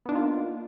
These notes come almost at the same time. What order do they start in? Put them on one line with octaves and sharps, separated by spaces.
B3 D4 D#4 F4 A#3